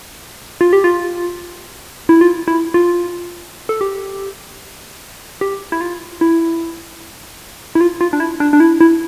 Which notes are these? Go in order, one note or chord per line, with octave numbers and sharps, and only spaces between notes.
F4
G4
F4
E4
F4
E4
F4
A4
G4
G4
E4
F4
E4
E4
F4
F4
D4
E4
D4
D4
E4
E4